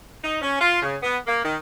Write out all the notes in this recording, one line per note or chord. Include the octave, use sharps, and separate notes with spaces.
D#4
C#4
F4
C#3
B3
A#3
D#3